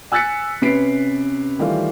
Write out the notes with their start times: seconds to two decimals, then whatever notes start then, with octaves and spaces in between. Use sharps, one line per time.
0.12 G#5 E6 F#6 A6 B6 C#7
0.62 C3 C#4 B4 B6 C7 D7
1.59 D#3 E3 G3 A3 F4